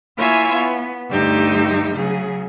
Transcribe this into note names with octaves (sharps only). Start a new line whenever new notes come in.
A#3 E4 F4 C#5 E5 G#5
B3
D2 G2 D#4 G4 E6 G6
C#3 F#3 G#4